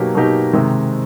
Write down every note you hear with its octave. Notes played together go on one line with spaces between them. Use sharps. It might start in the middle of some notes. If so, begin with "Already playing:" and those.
Already playing: B2 F#3 A#3 D#4 G4
B2 F#3 A#3 D#4 G4
C3 D#3 G#3